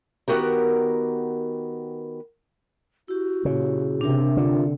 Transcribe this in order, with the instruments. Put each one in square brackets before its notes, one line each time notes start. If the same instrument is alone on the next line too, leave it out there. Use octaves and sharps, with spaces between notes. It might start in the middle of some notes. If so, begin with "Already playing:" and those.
[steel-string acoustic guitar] D#3 F#3 B3 F#4 G4 A#4
[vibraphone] E4 G4 [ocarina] F#4
[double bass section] A#2 [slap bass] C#3
[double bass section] C3 [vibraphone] D4 A#4 E5
[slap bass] D3 [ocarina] F4